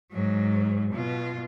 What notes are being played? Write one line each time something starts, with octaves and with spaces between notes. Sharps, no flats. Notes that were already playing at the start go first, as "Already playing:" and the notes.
G#2 F#3
B2 F4